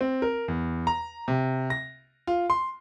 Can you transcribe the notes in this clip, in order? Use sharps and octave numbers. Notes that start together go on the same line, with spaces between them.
C4
A#4
E2
A#5
C3
A#6
F4
C6